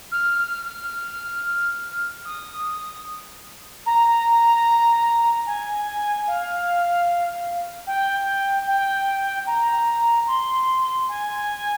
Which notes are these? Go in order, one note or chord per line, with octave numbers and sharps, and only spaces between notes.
F6
F6
F6
D#6
A#5
G#5
F5
G5
G5
A#5
C6
G#5